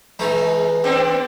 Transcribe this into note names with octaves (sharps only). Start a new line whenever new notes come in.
E3 G#3 D#4
B3 C4 D4